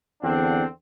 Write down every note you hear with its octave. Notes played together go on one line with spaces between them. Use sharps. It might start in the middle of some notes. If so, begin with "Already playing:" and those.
E2 D3 C4 D4 F#5